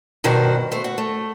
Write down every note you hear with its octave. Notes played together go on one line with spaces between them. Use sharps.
G2 B2 D#3 F#4 C5
A3 C5
F#4
A3